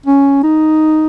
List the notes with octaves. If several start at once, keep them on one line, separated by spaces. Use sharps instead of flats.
C#4
D#4